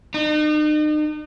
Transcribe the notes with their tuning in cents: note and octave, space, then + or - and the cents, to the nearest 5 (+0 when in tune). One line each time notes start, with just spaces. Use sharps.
D#4 -40